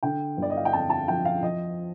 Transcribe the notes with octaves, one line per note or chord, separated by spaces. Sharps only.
D3 G5
G1
D5
D#5
F5
G5
F2 A5
A5
F3 G5
F5
F3 D#5